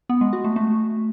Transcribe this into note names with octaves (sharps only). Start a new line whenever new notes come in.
B3
G#3
F#4
A3
A3